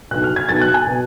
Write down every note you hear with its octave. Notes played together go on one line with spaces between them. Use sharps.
B1 B2 F#6
F6
G#6
B1 B2 A6
F#6
G#5
B2